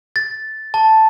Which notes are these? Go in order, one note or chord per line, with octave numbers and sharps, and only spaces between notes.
A6
A5